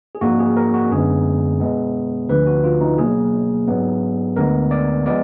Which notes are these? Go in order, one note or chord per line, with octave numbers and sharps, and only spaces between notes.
G#4
G#2 F3 A#3 F#4
G#4
A#4
F#4
F#2 D3 G#3 B3 G#4
B2 G#3 B3
D2 D3 F3 B4
F#4
F4
D#4
B2 F#3 A#3 G#4
G#2 F#3 B3
D2 D3 G#3 B3 A#4
D5
F3 G#3 B3 D5